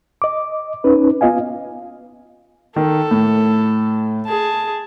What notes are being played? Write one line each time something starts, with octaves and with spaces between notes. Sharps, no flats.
D#5 D6
C#4 D#4 B4
B3 F4 D#5 F5 G#5
D#3 A4
A2
G#4 A5